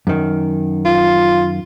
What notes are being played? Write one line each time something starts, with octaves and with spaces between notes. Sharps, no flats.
F#2 D#3
F4